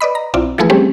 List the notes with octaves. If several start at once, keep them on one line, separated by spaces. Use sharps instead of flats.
B4 D5 D#5 B5
A#5
B1 C4 E4 F4 D5
E3 F3 A3 E4 G#4 B4
G3 A3 C4 C#4 G4 G#4